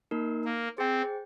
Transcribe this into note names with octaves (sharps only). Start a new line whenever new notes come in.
A#3 D#4 A#4
A#3
C4 G#4 C5 G5